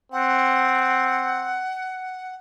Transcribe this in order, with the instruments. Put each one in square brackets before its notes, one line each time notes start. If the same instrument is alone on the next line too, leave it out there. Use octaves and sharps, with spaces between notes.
[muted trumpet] C4 [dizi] F#5